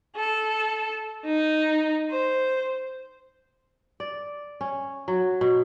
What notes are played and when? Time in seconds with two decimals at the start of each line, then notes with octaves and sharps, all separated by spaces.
0.15 A4
1.24 D#4
2.10 C5
4.00 D5
4.61 C#4
5.08 F#3
5.41 B2